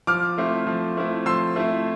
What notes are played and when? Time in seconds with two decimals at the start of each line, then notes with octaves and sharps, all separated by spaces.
0.07 F3 D6 F6
0.38 A3 C4 E4
0.67 F3
0.97 A3 C4 E4
1.26 F3 C6 E6
1.56 A3 C4 E4